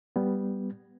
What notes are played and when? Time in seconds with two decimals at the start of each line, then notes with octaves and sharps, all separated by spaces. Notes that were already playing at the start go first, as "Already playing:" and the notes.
0.16 G3 B3